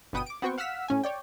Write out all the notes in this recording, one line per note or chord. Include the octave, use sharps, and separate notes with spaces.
G1 B2 B3 G5 D#6 D#7
D6 D7
B3 C4 F#4 C5 G5 C#6
F5 F#5 E6 F6 B6 E7
A2 C#4 G#5
C#5 D5 G5